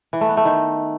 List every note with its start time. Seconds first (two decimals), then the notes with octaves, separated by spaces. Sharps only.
0.13 E3
0.21 A3
0.29 B3
0.37 A3
0.45 D#3